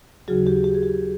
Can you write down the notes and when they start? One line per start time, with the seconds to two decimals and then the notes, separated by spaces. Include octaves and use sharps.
0.28 D#2 C#3 F#3 F#4 G#4
0.47 G4
0.64 G4
0.75 G#4
0.83 G4